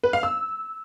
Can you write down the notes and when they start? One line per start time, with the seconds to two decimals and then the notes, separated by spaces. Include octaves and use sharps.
0.03 B4
0.13 F5
0.23 E6